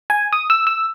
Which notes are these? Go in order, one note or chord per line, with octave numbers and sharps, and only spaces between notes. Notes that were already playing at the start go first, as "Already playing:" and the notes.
G#5
D#6
E6
E6